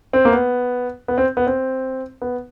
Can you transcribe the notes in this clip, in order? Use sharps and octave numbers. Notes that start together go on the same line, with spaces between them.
C4
A#3
B3
B3
C4
B3
C4
B3